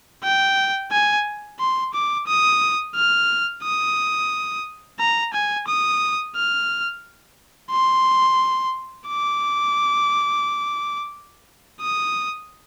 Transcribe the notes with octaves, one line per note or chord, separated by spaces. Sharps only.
G5
G#5
C6
D6
D#6
F6
D#6
A#5
G#5
D#6
F6
C6
D6
D#6